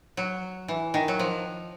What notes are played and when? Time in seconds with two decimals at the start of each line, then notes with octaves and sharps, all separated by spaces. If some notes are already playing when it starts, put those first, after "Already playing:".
0.17 F#3
0.68 E3
0.94 D#3
1.08 F#3
1.19 F3